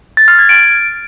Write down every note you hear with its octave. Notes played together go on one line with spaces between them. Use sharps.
A6
F6
G#6
D7